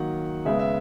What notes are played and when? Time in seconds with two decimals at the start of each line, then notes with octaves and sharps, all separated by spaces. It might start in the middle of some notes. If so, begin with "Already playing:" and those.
Already playing: D#3 F#3 A#3 F#5
0.45 C#3 G#3 B3 E5
0.59 E5